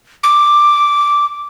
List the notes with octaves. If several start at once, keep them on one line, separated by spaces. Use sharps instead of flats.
D6